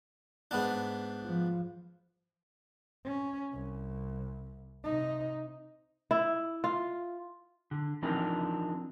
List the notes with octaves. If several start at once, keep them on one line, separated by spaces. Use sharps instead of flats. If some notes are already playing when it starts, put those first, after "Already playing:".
G#2 B3 D4
F3
C#4
C2
C3 D#4
E4
F4
D3
E3 F3 C4 D4 D#4 A#4